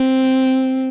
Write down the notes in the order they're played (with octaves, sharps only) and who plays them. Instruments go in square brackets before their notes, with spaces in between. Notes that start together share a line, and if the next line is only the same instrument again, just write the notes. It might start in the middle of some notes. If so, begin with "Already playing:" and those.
Already playing: [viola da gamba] C4